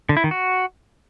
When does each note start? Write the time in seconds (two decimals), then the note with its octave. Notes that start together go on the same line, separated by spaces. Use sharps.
0.09 D3
0.17 E4
0.24 D#3
0.31 F#4